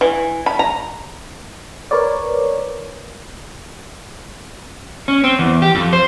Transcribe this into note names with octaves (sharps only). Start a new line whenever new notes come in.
E3
B5
A#5
A#4 B4 C#5 D5
C#4
C4
E2
G4
F2
C5